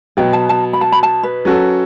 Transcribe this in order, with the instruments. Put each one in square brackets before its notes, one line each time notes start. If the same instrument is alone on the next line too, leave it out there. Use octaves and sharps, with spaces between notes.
[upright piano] B2 F#3 B3 [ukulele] G5
[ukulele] A5
A5
B5
A5
B5
A5
B4
[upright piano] F#3 C#4 F#4 A4